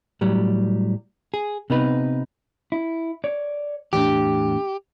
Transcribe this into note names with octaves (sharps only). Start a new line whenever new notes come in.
A2 F#3 G3
G#4
C3 B3 D#4 B4
E4
C#5 D5
E2 A2 D4 G4